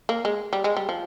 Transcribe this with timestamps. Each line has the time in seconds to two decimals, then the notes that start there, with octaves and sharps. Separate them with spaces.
0.09 A#3
0.25 G#3
0.53 G3
0.64 G#3
0.77 G3
0.89 F3